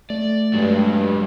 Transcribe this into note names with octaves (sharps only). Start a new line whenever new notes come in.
A3 D5
G2 F#3 G#3